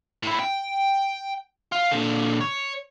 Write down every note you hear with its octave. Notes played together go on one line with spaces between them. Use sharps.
A2 E4
G5
F4
A#2 D3
C#5